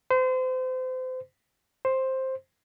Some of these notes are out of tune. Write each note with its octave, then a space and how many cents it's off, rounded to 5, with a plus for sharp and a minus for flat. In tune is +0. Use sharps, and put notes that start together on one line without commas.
C5 -30
C5 +10